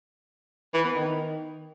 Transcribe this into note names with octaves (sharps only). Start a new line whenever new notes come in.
E3
B3
D#3